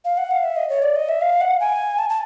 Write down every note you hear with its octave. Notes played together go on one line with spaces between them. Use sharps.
F5
F#5
F5
E5
D#5
C#5
D5
D#5
E5
F5
F#5
G#5
A5
A5